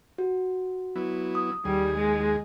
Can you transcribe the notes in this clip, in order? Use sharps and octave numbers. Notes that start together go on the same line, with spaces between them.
F#4
F#3 B3 E4
D#6
D#2 G3 G#4
G#3